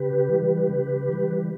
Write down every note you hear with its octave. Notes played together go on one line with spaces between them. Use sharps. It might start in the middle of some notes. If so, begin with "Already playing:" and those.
Already playing: C#3 G4 B4
E3 G3
C#3
E3 G3